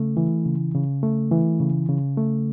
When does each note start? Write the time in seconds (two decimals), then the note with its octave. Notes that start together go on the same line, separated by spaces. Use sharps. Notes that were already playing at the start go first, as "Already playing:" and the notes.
Already playing: C#3 A3
0.17 E3
0.46 C#3
0.74 C#3
1.03 A3
1.31 E3
1.60 C#3
1.89 C#3
2.17 A3